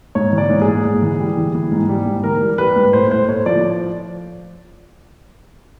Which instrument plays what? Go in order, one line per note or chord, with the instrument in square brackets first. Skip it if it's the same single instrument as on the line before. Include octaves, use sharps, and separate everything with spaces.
[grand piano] G#2 C#5
E3 D5
G#2
G#4
G#2
G#2
E3
G3
E3
E3
G#2
G3
G#2
E3 A#4
G3
G3 B4
G#2
A2 C5
A2 C5
A2 C#5
F3 D5